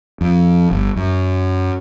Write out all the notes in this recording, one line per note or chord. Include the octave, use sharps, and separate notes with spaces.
F2
G1
F#2